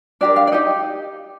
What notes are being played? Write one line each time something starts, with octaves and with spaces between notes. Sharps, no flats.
D4 G4 A#4 D5
F5
D5
D#4 G4 D#5